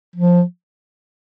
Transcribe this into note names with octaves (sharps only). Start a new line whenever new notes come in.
F3